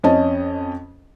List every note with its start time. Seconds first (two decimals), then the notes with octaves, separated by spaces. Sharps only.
0.04 F2 C#4 D#5 A5